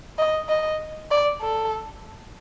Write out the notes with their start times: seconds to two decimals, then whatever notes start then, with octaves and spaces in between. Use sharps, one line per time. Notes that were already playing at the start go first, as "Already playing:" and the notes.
0.18 D#5
0.49 D#5
1.11 D5
1.41 A4